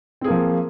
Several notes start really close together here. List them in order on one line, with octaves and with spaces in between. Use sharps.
C4 G#4 A#3 F3